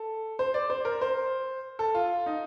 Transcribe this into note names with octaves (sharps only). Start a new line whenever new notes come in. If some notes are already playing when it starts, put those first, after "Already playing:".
Already playing: A4
C5
D5
C5
A#4
C5
A4
F4
D#4